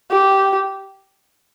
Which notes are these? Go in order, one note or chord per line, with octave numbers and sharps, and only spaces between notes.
G4